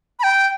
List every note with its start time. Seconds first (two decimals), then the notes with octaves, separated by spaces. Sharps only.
0.19 B5
0.23 G5